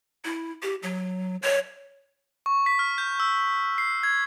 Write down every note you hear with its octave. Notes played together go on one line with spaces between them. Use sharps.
E4
G4
F#3
C#5
C#6
B6
F6
G6
E6
C7
G#6